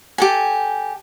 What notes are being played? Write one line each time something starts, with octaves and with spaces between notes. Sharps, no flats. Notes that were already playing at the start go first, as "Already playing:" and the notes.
G4 A4 G#5